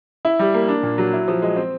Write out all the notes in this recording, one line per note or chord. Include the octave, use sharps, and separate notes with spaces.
E4
G3
A#3
D4
A#2
F#3
E4
F3
G#3
C4